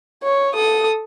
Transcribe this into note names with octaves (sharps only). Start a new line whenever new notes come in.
C#5
A4 D#6